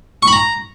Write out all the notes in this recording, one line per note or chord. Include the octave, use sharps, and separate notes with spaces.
C#6
B5
A#5